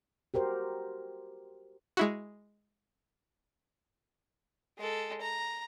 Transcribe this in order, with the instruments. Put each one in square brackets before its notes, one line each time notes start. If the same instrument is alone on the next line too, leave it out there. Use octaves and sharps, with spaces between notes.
[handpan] F#4 G4 A#4 C5
[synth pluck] G#3 E4 F#4
[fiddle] G#3 A4
A#5